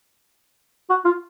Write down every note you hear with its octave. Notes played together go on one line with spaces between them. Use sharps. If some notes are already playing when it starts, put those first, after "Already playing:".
F#4
F4